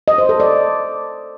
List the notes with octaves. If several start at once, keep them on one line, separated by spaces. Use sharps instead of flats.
D#5
C5
A4
D5